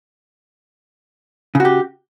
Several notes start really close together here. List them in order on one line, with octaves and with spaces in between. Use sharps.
C#3 F#4 G4